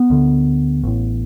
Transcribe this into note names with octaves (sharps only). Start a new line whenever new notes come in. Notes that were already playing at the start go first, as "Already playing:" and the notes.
Already playing: B3
D2 D3
A1 A2